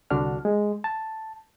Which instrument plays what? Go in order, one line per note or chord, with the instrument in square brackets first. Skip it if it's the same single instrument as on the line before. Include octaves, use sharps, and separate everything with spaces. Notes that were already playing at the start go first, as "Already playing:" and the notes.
[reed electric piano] C2 D3 D4 F#4 F6
G#3
A5